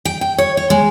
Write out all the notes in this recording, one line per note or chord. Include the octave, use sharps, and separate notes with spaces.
G5
G5
C#5
C#5
G#3